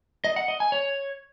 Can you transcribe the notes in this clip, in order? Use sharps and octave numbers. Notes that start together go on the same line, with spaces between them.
D#5
F#5
D#5
G#5
C#5